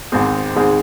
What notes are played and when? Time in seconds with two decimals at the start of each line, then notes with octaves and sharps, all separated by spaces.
0.12 G#1 G#2 G#3 C4 G#4
0.56 G#1 G#2 G#3 C4 G#4